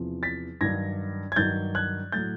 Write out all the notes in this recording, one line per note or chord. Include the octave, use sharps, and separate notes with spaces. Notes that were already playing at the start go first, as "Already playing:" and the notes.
Already playing: E2 C3 F3
A6 B6
G2 D#3 F#3 G#6 A#6
G#6
G2 D#3 F#3 G6 A6
F#6 G#6
A2 F#3 G6 A6